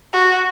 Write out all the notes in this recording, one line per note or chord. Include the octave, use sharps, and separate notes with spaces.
F#4